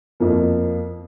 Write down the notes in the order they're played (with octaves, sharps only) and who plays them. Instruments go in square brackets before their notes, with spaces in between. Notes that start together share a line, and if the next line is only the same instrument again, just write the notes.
[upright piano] F2 F3 A#3